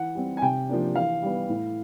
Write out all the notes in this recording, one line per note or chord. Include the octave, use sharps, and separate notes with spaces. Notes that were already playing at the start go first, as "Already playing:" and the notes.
Already playing: E3 F#5
G3 C4
G#5
C3 G5
F3 A#3 D4
E3 F5
G3 B3
A2